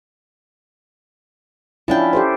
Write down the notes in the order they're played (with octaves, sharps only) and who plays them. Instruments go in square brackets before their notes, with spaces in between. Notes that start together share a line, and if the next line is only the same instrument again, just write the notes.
[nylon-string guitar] F3 D4 G5 [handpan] C#4 E4
[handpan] G4 A4 C5